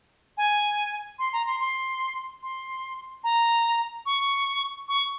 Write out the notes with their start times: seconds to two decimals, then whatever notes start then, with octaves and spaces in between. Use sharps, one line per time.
0.37 G#5
1.19 C6
1.33 A#5
1.46 C6
1.60 C6
2.43 C6
3.24 A#5
4.06 C#6
4.88 C#6